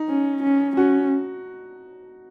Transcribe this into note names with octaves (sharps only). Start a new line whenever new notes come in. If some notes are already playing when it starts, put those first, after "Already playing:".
Already playing: D#4
C#4
C#4
C#4 F#4